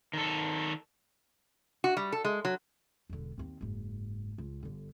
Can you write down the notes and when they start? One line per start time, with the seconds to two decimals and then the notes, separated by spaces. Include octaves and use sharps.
0.13 D#3 A4
1.84 F#4
1.97 G3
2.12 A4
2.25 G#3
2.45 F#3
3.09 E1 D3
3.38 D#2 C4
3.61 F#1 G#2
4.38 C#2
4.63 G1 D3